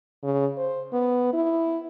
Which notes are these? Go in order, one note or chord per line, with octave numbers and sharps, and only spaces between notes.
C#3
C5
B3
E4